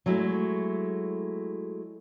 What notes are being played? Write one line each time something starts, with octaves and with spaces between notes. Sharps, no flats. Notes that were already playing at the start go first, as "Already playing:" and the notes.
F#3 G#3 A3 E4